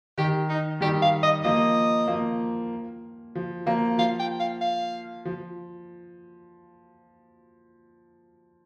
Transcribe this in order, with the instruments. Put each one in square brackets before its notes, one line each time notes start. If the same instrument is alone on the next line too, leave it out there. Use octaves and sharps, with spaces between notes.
[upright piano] D#3 [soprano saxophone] G4
[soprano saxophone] D#4
[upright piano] D#3 G3 [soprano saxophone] G4
[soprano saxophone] F5
D#5
[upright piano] F3 A#3 [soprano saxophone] D#5
[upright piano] F3 A#3
F3
F3 A#3
[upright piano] F3 [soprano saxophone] F5
[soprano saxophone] G5
F5
F5
[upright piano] F3